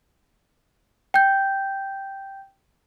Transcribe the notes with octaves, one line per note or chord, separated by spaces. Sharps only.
G5 G6